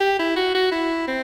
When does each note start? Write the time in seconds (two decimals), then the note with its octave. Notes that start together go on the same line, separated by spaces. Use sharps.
0.01 G4
0.19 E4
0.36 F#4
0.55 F#4
0.72 E4
1.08 C4